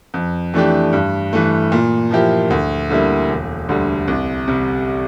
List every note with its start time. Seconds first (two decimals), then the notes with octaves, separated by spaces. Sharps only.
0.14 F2
0.54 E3 A3 D4 G4
0.93 G2
1.33 E3 A3
1.72 A#2
2.11 F3 A#3 E4 G4
2.50 D2
2.90 D3 G3 A#3 E4
3.30 E1
3.69 D2 D3 G3
4.08 C2
4.48 C3 G3